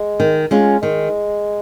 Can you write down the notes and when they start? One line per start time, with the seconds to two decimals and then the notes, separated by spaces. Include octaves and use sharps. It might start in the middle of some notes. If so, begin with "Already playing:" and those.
Already playing: G#3
0.20 D#3
0.51 G#3 C#4 F4
0.82 D#3 G#3